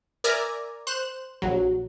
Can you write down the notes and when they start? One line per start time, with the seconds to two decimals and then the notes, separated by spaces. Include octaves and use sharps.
0.24 A#4 D5 E5 G#5 A#5
0.87 C5 F#6 E7
1.42 A#1 F#3